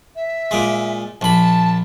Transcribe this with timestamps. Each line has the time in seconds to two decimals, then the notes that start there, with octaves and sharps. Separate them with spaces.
0.16 E5
0.51 A#2 G#3
1.21 A#1 A5 B5